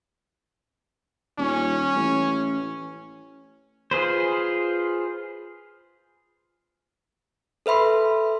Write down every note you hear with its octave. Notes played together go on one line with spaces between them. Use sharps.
D#1 C#4
A1
F4 G#4 B4 C5
A4 B4 E5 B5 C6